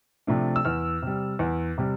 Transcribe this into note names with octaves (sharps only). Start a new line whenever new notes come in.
C3 F3 A3 D4
E6
E2 F6
C3 G3
E2
C3 G3